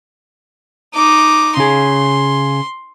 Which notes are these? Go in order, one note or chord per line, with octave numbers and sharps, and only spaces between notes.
D#4 D6
C#3 G#4 C6